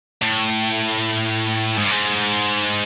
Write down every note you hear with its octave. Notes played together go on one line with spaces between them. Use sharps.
A2
G#2
G2
G#2